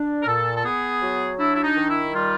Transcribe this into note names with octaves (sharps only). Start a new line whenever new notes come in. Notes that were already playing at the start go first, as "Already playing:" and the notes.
Already playing: D4
A#4
A#2 A4
A4
B3 G#4
F#3
D4 E4
E4
D#4
D#3
E4
G3 F4